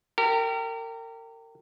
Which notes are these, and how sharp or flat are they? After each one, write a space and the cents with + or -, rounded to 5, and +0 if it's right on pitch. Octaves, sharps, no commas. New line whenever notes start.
G4 -10 A#4 -35